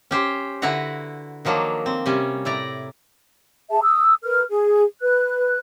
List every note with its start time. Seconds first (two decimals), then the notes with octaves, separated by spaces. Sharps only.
0.11 C#4 G4 C5
0.62 D3 E4 F#4 B4 F#5 A#5
1.45 D#3 F3 F#3 A#3 D4
1.86 C4
2.06 C3 G3 C#4
2.45 A2 E4 D5 A#5
3.70 G#4 E5 A5
3.82 D#6 E6
4.23 A#4 B4 F6
4.50 G#4
5.01 B4 F#6